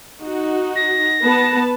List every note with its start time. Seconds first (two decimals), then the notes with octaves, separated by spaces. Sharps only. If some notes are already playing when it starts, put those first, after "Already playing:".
0.23 D#4 F#4
0.76 A#6
1.23 B3 B4 A5